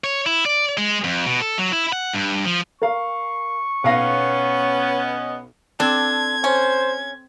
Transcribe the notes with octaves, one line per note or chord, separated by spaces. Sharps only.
C#5
E4
D5
G#3
F2
B2
A4
F#3
E4
F#5
G2
F3
A#4 F5 C#6
B1 B3 C#4 F5 A#6
D#5
C4 D4 A4 G#6
C#4 C5